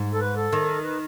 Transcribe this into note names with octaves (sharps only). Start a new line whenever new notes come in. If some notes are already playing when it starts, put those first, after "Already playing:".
Already playing: G#2
A4
B4
A4
D#3
B4